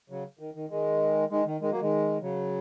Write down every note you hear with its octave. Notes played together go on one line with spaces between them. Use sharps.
C#3 F#3
D#3
D#3
D#3 G#3
D#3 G#3
D#3
D#3 G#3
F#3 A#3
D#3 G#3
C#3 F#3